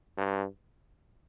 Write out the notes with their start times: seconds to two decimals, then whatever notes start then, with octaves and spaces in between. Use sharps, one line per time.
0.17 G2